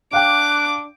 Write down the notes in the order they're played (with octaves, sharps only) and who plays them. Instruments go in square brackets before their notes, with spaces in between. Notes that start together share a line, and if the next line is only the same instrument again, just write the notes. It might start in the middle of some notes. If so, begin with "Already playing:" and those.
[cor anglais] D4 [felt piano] F5 G5 [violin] D6 [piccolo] F#6